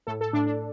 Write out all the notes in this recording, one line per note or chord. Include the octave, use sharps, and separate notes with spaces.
A2 A4
A4
A2 D4
D4